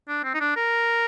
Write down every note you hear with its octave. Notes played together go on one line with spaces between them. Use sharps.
D4
C4
D#4
D4
A#4